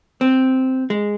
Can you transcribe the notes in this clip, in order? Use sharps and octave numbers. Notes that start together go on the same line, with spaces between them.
C4
G#3